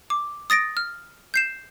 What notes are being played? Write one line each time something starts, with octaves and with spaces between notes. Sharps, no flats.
D6
D#6 A6 A#6 D7
F6
G6 C7 E7